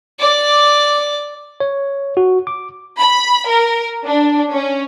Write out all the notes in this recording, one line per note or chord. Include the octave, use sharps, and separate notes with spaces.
D5 D6
C#5
F#4
D6
B5
A#4
D4
C#4